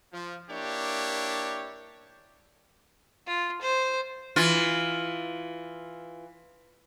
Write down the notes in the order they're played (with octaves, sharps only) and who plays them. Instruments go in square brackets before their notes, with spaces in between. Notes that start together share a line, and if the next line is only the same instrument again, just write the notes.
[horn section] F3
A#3 D4 E4 G4 C#5
[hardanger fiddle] F4
C5
[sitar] E3 F4